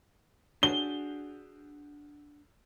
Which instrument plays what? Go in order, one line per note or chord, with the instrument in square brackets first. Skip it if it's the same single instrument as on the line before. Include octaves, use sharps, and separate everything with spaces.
[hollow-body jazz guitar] D4 F#4 G#4 [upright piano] G7